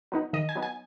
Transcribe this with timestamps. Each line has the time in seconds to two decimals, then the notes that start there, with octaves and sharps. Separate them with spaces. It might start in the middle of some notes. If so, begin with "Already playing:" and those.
0.12 F#3 B3 D#4
0.33 D#3 D#5
0.49 G#5
0.55 F#3 B3 D#4
0.62 G#5